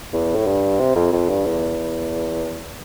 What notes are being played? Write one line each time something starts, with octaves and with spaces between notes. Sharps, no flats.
E2
A2
G2
C3
F2
F2
G2
E2